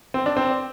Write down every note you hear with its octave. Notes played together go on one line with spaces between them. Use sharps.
C4
D4
C4